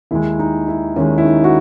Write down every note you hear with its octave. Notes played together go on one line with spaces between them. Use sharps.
D#2 D#3 G#3 E4
D#4
E4
D#2 D#3 G#3 C#4
E4
D#4
F#4